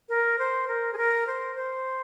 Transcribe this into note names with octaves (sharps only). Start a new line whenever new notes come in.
A#4
C5
A#4
G#4
A#4
C5
C5